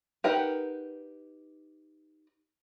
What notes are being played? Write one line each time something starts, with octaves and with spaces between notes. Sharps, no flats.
D#4 G4 A#4 B4 F#5